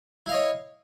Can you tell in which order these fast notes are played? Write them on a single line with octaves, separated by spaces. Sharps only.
E4 F5 D#5 C#5